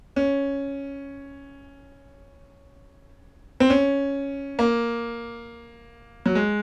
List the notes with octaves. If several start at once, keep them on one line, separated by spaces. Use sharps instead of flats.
C#4
C4
C#4
A#3
F#3
G#3